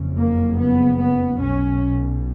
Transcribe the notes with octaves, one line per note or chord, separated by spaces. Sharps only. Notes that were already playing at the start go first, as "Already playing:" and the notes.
Already playing: F#1 F2 C#3
A#3
B3
B3
B1 B2 C#4